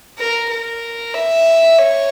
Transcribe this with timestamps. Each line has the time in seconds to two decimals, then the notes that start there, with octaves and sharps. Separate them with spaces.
0.19 A#4
0.50 A#4
1.14 E5
1.78 C#5